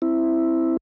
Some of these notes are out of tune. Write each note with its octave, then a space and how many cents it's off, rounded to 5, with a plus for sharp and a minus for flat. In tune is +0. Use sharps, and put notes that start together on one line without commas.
C4 +0 E4 +0